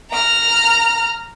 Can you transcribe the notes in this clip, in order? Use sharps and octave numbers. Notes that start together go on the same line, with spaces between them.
A#5 F6